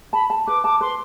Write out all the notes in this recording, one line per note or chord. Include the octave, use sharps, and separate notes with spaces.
A5 B5
A5
B4 D6
A5 D6
B4 C6